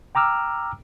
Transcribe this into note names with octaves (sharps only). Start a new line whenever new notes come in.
G5 A#5 D6 E6 F6